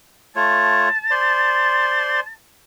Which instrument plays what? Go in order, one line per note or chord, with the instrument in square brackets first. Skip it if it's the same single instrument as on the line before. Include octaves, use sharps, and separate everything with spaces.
[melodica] A3 F4 C#5 [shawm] A5
[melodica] C5 D5 C6